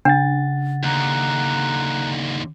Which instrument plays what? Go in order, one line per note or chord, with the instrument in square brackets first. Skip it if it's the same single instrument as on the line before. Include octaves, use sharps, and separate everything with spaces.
[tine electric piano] C#3 F#5 A6 [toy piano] D4
[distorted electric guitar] D#2 D3 [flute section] A#5 F#6